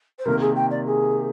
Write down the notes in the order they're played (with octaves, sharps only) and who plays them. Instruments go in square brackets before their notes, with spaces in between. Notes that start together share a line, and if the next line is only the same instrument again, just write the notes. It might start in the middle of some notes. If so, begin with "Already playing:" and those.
[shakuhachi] C5
[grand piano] C3 D#3 A#3 [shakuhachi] A#4
[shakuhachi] G#4
G5
D5
G#4